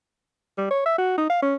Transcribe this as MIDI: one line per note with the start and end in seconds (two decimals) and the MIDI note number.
0.58 0.67 55
0.71 0.84 73
0.86 0.96 76
0.98 1.13 66
1.18 1.26 63
1.30 1.40 77
1.42 1.55 61